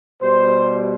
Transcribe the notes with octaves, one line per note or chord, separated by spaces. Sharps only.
B2 G3 C5